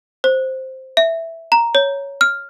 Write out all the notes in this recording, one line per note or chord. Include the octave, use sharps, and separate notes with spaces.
C5
E5
A#5
C#5
F6